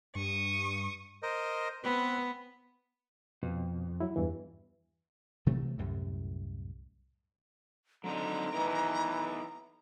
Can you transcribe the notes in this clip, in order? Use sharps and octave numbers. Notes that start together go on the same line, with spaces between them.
G2 C#6 D#6
A#4 C5 D#5
B3 C4 B4
F2 B2
F#3 E4
E2 G2 E3
C3 E3 F#3 A3
C2 F#2 A2
D3 F#3 C4 D#4 A#5
E3 B3 D#4 A#4